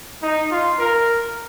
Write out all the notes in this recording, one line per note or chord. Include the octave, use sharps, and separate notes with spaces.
D#4
F4
A#4